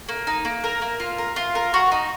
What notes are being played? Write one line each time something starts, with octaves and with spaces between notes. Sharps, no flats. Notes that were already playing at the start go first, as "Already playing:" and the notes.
A#3
D#4
A#3
A#4
A#3
F4
A#4
F4
A#4
F#4
D#4